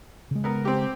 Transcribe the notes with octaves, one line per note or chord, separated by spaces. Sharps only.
C#3 G#3
B3 A#4
C4 G4